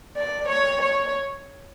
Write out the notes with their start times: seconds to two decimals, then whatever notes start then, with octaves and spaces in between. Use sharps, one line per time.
0.16 D5
0.48 C#5
0.81 C#5